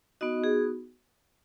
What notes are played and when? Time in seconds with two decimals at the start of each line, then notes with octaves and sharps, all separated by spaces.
0.21 B3 D#4 F#4 D#5
0.44 G#4